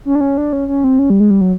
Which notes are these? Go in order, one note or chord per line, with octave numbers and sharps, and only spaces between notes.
C#4
D4
C#4
D4
C#4
C#4
C4
C#4
G3
G#3
G3
F#3